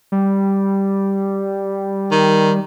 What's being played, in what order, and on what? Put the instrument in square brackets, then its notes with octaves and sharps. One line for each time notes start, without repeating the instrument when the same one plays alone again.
[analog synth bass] G3
[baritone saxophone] D#3